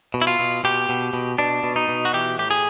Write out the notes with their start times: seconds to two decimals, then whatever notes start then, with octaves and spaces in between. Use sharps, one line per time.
0.14 B2
0.22 E4
0.27 F4
0.39 B2
0.64 B2 G4
0.89 B2
1.13 B2
1.38 B2 D4
1.64 B2
1.76 D#4
1.89 B2
2.05 F#4
2.13 E3 G4
2.38 A2 G4
2.51 G#4